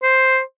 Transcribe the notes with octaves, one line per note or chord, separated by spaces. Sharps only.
C5